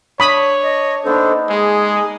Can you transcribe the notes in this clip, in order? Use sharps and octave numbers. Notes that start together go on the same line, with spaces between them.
D4 C#5 B5 D#6
D#5
A#3 B3 D4 D#4 A4 C5
G#3 G#4